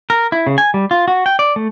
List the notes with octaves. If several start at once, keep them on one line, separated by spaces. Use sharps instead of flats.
A#4
E4
C#3
G#5
G3
F4
F#4
G5
D5
A3